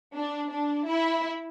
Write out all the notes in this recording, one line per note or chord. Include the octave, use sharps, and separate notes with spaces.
D4
D4
E4